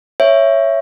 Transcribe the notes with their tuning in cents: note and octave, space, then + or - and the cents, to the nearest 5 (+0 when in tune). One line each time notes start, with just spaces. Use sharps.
C#5 +0 E5 +10